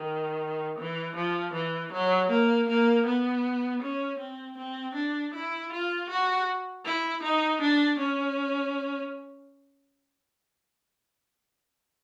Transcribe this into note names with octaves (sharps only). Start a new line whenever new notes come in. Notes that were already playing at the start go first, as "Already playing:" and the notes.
Already playing: D#3
E3
F3
E3
F#3
A#3
A#3
B3
C#4
C4
C4
D4
E4
F4
F#4
E4
D#4
D4
C#4